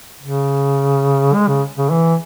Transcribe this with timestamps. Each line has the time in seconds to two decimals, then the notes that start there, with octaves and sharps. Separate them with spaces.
0.22 C#3
1.35 G#3
1.48 C#3
1.77 C#3
1.90 E3